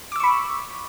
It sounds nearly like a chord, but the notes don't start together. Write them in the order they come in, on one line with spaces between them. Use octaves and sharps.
D6 E6 C#6 B5